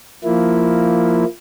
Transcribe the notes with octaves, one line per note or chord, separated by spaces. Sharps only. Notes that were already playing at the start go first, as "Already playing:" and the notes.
F3 A#3 E4